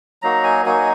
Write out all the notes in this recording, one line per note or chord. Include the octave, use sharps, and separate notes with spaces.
F#3 A#3 D#4 F#4 A#5
G#5
F#3 A#3 D#4 F#4 G#5